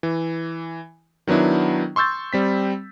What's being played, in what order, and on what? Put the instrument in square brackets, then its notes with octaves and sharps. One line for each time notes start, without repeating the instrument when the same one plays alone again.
[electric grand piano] E3
D#3 F#3 B3 D4 E4
C6 C#6 E6 G6 A6
G3 C4 B6